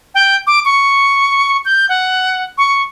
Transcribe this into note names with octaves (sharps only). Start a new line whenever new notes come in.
G5
D6
C#6
G6
F#5
C#6